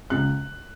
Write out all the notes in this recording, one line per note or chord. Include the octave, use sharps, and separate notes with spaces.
C#2 F#6